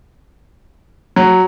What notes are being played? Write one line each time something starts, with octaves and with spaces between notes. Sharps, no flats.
F#3